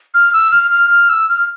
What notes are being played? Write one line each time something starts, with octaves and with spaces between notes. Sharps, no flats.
F6
E6
F6
F6
F6
E6
F6